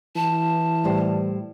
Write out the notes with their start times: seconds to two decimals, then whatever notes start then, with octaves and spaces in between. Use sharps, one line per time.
0.16 E3 A5
0.84 A2 G3 C5